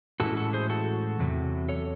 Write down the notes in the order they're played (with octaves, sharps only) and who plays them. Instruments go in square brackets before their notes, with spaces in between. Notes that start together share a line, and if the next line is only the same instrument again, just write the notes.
[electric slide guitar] A2 E3 G#3 C#4 E4 F#4 A4
F#4 A4
G#4 C5
F#4 A4
E2 C3 F#3
A4 C#5